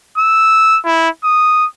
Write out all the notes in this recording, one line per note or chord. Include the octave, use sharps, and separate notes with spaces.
E6
E4
D#6